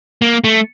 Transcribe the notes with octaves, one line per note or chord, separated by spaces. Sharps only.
A#3
A3